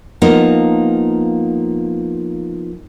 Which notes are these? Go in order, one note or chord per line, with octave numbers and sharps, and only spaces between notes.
F3 A#3 B3 D#4 F4